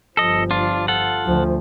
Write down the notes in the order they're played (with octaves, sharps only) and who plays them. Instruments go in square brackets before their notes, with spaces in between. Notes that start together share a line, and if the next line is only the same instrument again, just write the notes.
[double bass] G1 F3 [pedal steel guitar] A4 D#5
[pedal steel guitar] D4 F4
F4 A4 F#5
[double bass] D2 F3